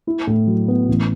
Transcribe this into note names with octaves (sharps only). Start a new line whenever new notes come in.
E4
A2
F#3
B3
A1